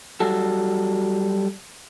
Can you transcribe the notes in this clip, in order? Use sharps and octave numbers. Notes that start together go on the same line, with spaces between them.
F#3 G3 F#4 A4